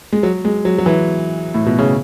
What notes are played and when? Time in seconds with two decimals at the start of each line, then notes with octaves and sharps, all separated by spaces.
0.12 G#3
0.23 F#3
0.45 G#3
0.65 F#3
0.78 F#3
0.86 E3
1.54 A2
1.66 B2
1.79 C#3